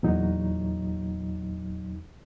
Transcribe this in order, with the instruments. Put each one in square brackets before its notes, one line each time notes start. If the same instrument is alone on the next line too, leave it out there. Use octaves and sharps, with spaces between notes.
[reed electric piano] E2 A#2 F#3 D#4